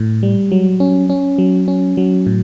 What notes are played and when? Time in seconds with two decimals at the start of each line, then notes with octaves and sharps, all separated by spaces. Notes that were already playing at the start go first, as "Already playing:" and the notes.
Already playing: A2
0.23 G3
0.52 F#3
0.80 C#4
1.10 C#4
1.38 F#3
1.68 C#4
1.97 F#3
2.26 A2